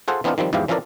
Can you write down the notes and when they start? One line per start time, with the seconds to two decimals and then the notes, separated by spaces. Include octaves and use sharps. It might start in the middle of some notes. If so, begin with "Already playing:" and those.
0.08 F4 G#4 A4 C5 F#5
0.24 E3 B3 C4 D4 D#4 F4
0.38 D#3 F3 G3 C4
0.53 E2 G#2 F3 E4 G4 F5
0.68 E3 F3 C#4 A4 A#4 D5